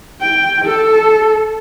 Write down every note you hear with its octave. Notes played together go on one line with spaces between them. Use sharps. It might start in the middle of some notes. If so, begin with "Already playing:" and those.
G5
A4